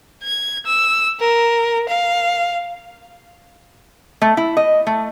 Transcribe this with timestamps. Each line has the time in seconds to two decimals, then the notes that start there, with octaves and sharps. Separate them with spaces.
0.24 G#6
0.66 E6
1.20 A#4
1.89 F5
4.22 A3
4.37 E4
4.57 D#5
4.87 A3